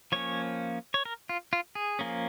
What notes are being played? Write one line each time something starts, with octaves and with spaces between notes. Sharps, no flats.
F3 A#3 C#4 C#5
C#5
A#4
F4
F4
G#4
F3 A#3 C#4